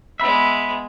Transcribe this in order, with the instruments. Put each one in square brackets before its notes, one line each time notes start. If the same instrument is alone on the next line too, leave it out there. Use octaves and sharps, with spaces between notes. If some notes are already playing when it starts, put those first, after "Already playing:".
[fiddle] G#3 B3 [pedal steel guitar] E5 B5